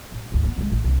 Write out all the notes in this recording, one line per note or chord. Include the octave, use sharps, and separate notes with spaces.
A1
D2 G#2
A3 B3
C2 G#3
A1
C2 D3